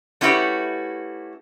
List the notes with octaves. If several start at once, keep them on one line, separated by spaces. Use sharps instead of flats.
A3 C#4 E4 F#4 G4 B4